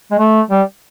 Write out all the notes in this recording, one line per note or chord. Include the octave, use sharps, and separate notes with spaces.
G#3
A3
G3